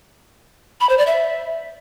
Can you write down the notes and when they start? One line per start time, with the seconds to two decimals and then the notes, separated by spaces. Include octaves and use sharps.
0.81 B5
0.89 C5
0.98 D5
1.07 E5